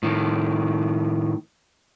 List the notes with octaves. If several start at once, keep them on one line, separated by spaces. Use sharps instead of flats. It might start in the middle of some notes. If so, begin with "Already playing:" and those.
A2 D#3